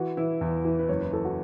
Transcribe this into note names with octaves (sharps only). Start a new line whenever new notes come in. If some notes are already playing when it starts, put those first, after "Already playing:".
Already playing: E3 F#4
E3 E4
E2
E3
B4
F#1 C#5
B4
E3 A4
F#4